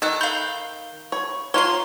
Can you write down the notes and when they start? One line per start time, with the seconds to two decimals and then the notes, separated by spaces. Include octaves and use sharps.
0.02 D#3 A4 E6 F#6
0.21 F5 B5 G6 G7
1.12 C#5 B5
1.54 A#3 F4 C#5 A#5 C6 G7